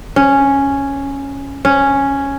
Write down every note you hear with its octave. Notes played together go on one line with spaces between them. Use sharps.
C#4
C#4